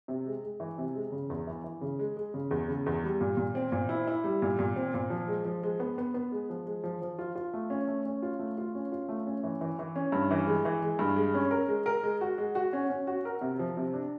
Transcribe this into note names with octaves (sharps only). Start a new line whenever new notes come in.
C3
G#3
G#3
E3
C3
G#3
C#3
E2
E3
E3
C#3
G#3
G#3
C#3
E2
C#3
E2
G3
A#2
A#2
C4
A#2
E4
E4
G3
A#2
A#2
C4
A#2
F3
G#3
F3
G#3
B3
B3
B3
G#3
F3
G#3
F3
F3
F4
F4
A3
C#4
A3
C#4
F4
A3
F4
C#4
F4
A3
C#4
E3
E3
E3
C#4
G2
E3
G#3
E3
G#3
G2
G#3
C#4
A#4
G#3
A#4
G#3
F#4
G#3
F#4
C#4
C#4
F#4
A#4
C3
F3
C3
D4